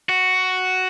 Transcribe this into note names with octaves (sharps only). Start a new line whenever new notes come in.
F#4